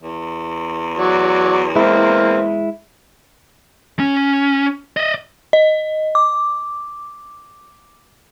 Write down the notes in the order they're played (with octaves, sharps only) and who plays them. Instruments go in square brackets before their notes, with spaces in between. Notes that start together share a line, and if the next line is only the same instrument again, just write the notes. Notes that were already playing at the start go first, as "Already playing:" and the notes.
[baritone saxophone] E2
[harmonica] F#3 D5
[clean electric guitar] G#3 E4 [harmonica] A#3 C4
[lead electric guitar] C#4
D5 D#5
[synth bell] D#5
D6